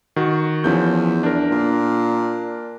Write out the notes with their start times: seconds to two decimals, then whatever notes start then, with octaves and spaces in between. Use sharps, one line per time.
0.16 D#3 F#4
0.64 E2 F3 C#4 G6
1.23 D4 A#4
1.51 A#2